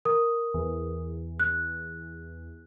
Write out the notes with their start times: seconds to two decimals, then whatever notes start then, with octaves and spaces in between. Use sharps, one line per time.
0.05 A#4 D#6
0.54 E2
1.40 F#6